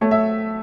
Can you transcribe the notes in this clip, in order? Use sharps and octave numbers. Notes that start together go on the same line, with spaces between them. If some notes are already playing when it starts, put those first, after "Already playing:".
A3 C#5
E5